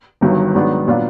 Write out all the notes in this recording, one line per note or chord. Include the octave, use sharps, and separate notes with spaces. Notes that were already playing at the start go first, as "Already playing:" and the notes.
G1 G2 D#3 F#3
G#2 D#3 F#3 B3 D4
A#2 F#3 B3 D4 F4